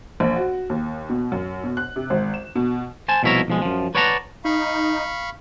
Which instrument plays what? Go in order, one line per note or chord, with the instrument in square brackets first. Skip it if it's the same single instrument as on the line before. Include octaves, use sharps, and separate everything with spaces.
[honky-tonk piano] A#1
F#4
D#2
B2
F#2
B2
F#6
C3
G#1
E7
B2
[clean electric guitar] C5 G#5 A5
C2 B2 F3 E4 C#5 A#5
B1 F3 G#3
F#2 F3
B4 C#5 D5 F#5 A5 A#5
[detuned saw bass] D#4 [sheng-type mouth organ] F5 B5 C#6